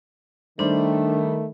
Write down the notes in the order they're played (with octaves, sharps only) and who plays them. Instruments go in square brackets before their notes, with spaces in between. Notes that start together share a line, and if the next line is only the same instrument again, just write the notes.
[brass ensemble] D#3 [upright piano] G3 C5 [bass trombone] A3 [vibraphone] D4